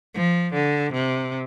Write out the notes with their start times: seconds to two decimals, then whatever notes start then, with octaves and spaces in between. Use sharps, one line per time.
0.15 F3
0.53 D3
0.93 C3